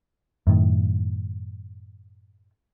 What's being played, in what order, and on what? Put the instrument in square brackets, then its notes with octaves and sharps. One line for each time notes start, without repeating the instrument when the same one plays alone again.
[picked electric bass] F#2 A2 D#3